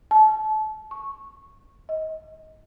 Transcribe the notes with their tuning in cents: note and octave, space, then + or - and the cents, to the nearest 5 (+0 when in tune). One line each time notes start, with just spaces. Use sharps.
A5 -30
C#6 -5
D#5 +30